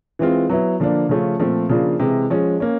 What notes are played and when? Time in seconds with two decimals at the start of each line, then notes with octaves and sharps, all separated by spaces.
0.19 E3 G#3 C4 F4
0.49 F#3 B3 E4
0.80 D3 F3 A#3 D4
1.09 C#3 F3 A3 C#4 F4
1.39 A#2 F3 A3 C4
1.69 C#3 F3 A#3 D4 F4
1.99 C3 E3 G#3
2.30 F3 G#3 C#4
2.60 A#3 C#4